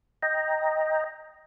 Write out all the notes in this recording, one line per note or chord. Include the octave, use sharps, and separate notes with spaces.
D#5 G5 A#5